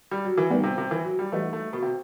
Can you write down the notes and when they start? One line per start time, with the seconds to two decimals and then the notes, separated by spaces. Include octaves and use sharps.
0.11 G3
0.25 F#3
0.38 E3
0.50 A2 D#3 G3 B3
0.63 C3
0.78 C3
0.91 E3
1.05 F#3
1.19 G3
1.32 E3 G3 A3 D#4 F#4
1.53 A3
1.73 B2
1.82 C3